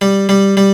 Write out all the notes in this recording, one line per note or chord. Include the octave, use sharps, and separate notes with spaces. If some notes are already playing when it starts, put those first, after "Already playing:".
G3
G3
G3